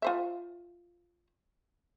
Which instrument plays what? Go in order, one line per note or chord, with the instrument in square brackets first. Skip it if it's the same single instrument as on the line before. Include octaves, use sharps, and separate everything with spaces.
[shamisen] F4 C5 E5